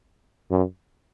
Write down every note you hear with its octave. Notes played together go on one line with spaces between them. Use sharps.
F#2